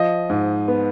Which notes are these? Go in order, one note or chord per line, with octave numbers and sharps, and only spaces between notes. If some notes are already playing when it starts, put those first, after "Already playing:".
Already playing: F3 D#5
G#2
B3